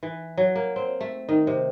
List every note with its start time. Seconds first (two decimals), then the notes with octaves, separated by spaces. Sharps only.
0.03 E3
0.37 F#3
0.55 A#3
0.76 C4
1.01 A3
1.29 D#3
1.47 C3